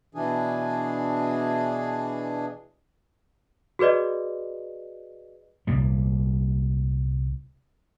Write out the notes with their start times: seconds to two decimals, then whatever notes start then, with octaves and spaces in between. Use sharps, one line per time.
0.15 B2 E3 D4 G#4
3.79 F#4 G#4 B4 D5 D#5
5.67 C2 A#2 G3